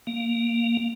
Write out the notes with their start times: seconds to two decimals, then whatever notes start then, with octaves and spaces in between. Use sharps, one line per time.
0.07 A#3